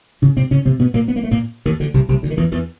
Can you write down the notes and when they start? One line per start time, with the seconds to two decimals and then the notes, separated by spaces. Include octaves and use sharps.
0.22 C#3 C#4
0.37 C3 C4
0.51 C#3 C#4
0.65 C3 C4
0.79 B2 B3
0.94 A#2 A#3
1.08 B3
1.16 A#3
1.24 A3
1.31 A#2 A#3
1.65 D#2 D#3
1.80 D2 D3
1.94 C2 C3
2.09 C2 C3
2.23 D2 D3
2.30 D#3
2.37 E2 E3
2.52 E2 E3